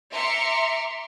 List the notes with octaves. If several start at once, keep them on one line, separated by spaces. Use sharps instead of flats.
E5 A#5 C6 D6 C#7